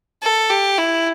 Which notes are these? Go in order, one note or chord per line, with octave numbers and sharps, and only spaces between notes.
A4
G4
E4